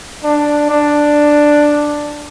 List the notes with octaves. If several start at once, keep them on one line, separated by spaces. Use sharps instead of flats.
D4
D4